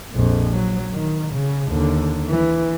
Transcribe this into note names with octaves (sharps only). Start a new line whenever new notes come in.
A#1 F2
F#3
D#3
C#3
D#2 D3
E3